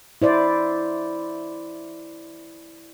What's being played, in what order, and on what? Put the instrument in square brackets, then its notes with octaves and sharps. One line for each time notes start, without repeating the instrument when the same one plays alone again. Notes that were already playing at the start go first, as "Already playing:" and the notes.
[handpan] E4 C5 D5